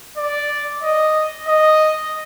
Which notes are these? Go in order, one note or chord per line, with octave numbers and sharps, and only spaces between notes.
D5
D#5
D#5